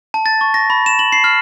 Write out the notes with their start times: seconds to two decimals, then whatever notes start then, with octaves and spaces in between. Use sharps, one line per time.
0.14 A5
0.26 A6
0.41 C#6
0.54 A#6
0.70 B5
0.86 E7
0.99 F#7
1.12 C7
1.24 F6